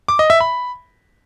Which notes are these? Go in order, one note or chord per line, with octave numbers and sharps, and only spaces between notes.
D6
D#5
E5
B5